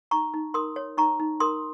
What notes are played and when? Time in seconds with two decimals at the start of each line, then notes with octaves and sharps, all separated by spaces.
0.11 D#4 A#5 C#6
0.34 D#4
0.54 A#4 C6 D#6
0.76 C#5
0.97 D#4 A#5 C#6
1.20 D#4
1.40 A#4 C6 D#6